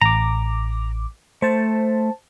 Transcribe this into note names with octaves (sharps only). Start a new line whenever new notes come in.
A1 A#5 D6
A3 C5 A5